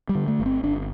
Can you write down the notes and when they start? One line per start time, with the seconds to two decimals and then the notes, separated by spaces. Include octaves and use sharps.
0.09 G3
0.15 D3
0.28 A3
0.40 G1
0.46 C4
0.63 G1 D4